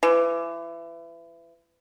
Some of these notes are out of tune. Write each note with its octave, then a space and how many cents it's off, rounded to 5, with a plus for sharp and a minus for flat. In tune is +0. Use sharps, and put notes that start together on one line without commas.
E3 +30